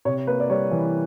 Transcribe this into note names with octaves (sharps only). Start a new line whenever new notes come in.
C3 C#5
A#3 B4
D5
G3 C#5
E3